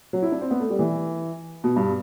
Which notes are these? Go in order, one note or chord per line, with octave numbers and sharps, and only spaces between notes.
F#3
E4
D4
C4
B3
A3
G3
E3
B2
G2